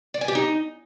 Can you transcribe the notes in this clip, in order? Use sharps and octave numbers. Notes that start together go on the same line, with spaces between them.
D5
G#5
G4
D#4